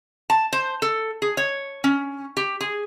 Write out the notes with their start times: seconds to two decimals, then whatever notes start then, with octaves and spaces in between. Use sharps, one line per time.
0.30 A5
0.53 C5
0.82 A4
1.22 G#4
1.37 C#5
1.84 C#4
2.37 G4
2.61 G#4